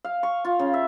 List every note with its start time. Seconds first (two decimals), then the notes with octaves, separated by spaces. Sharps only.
0.05 F5
0.23 C#6
0.45 F4
0.59 C#3
0.74 E5